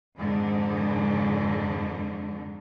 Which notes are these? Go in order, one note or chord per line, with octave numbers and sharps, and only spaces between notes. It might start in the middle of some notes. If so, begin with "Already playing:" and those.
F2 G#2 D3 D#3